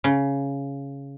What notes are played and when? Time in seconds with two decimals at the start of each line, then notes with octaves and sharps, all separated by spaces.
0.04 C#3